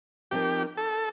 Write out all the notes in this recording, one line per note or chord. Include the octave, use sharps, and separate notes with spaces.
F3 C4 D#4 G4 A#4
A4